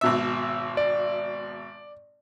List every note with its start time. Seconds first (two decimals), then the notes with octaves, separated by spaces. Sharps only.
0.01 G#1 B2 E5
0.77 D5